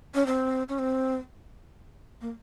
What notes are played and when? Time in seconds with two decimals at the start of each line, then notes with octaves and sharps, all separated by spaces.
0.15 C#4
0.26 C4
0.69 C#4
0.79 C4
2.21 A#3